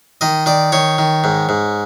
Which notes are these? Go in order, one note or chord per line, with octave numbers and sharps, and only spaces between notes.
D#3 D#5
D#3 D5
D#3 C#5
D#3
G#2
G#2